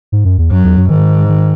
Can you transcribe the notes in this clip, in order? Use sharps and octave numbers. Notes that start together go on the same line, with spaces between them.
G#2
F#2
E2
F#2 F#3
E2
F#2
G#2 D#3
D#3